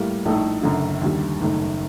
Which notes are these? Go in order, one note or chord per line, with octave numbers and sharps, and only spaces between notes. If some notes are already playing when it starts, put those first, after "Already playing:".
Already playing: A2 G3 A#3
A#1 A2 A3 D#4 A4
F#1 F#2 D3
D#2 D3 G3
F#1 F#2 D#3 A3